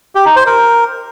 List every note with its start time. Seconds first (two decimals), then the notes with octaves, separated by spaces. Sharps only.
0.15 G4
0.26 D#4
0.36 C5
0.46 A#4